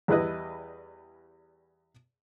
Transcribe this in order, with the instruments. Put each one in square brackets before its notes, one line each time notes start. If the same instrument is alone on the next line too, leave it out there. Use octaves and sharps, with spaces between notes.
[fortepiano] E2 G3 E4 B4 D#5